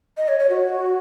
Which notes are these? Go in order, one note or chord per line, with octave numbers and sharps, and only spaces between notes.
D#5
C#5
C#5
F#4